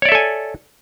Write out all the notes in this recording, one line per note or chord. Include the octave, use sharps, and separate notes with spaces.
A4 C#5 D5 E5 G#5